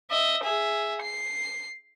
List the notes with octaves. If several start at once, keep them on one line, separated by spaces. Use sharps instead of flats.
D#5 E5
G#4 E5
C7